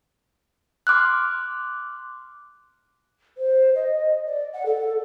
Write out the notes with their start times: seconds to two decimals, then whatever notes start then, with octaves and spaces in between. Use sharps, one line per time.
0.87 C6 D6 F6 F#6
3.38 C5
3.75 D#5
4.26 D5
4.53 F#5
4.66 A4